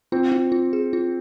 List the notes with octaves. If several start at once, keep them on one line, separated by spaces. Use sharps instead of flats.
C4 F4
F4
F4
G#4
F4